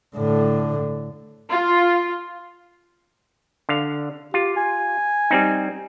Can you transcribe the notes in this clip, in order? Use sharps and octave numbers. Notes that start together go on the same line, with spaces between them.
A2 D3
F4
D3 F5
F4 G4
G#5
G3 C4 D#4